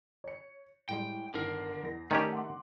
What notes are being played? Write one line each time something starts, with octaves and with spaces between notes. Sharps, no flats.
C#5 C#7
A2 G3 G#3 G5
G1 D3 D#3 A#4 C7
E2 A#6
D#3 A3 C#4 G4 D5
F#5 C6 D6